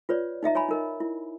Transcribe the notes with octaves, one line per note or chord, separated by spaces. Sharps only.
F4 B4 C#5 D5
D#4 D#5 E5 A#5
C#5 G#5 A#5 B5
D#4 A#4 D#5
E4